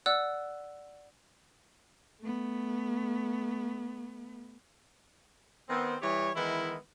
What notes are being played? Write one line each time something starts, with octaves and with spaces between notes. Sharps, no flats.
D5 F#5 E6 F#6
A3 B3
D#3 B3 C4
E3 G3 G4 C#5
D#3 E3 G#3 B3 E4